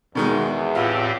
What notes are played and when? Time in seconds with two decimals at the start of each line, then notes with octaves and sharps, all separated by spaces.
0.15 E2 B2 D#3 G#3
0.75 A2 C4 F4 G4